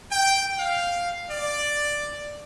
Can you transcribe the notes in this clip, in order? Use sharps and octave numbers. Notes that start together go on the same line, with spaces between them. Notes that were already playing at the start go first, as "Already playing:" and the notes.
G5
F5
D5